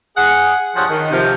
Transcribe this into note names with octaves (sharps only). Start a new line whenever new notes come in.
G#4 F#5
G2 F3 G3 G#4 C#5 F#5
D#3
C3 F3